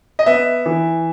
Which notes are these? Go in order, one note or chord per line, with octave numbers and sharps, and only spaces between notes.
D#5
B3 E5
E3